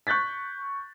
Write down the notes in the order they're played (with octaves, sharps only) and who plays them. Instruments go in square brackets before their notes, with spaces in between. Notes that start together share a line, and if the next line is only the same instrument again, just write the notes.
[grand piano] C#6 F#6 G6 A6 B6